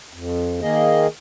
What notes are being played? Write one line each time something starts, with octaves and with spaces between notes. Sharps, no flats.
F2
D#3 A#3 G#4 D#5